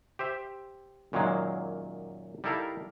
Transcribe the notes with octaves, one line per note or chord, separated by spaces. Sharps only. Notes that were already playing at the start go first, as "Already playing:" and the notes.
G4 C5 E5
F#2 A#2 D#3 F#3 G#3 A#3
G3 D#4 E4 A4 A#4 F5